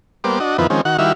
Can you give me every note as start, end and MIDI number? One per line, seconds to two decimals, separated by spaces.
0.24 0.39 55
0.24 0.39 58
0.24 0.39 59
0.24 0.39 72
0.24 0.39 86
0.40 0.57 62
0.40 0.57 66
0.40 0.57 75
0.58 0.67 41
0.58 0.67 51
0.58 0.67 53
0.58 0.67 59
0.58 0.67 64
0.58 0.67 71
0.70 0.81 51
0.70 0.81 53
0.70 0.81 56
0.70 0.81 60
0.70 0.81 61
0.85 0.97 51
0.85 0.97 66
0.85 0.97 78
0.98 1.12 51
0.98 1.12 55
0.98 1.12 64
0.98 1.12 66
0.98 1.12 76
0.98 1.12 77